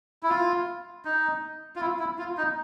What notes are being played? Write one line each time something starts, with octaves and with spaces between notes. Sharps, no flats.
E4
F4
D#4
F4
E4
E4
F4
D#4